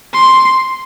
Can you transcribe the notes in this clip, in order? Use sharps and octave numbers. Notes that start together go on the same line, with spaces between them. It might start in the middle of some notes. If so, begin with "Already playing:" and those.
C6